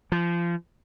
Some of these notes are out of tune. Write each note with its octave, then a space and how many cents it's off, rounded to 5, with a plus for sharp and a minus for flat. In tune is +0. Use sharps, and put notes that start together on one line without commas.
F3 -25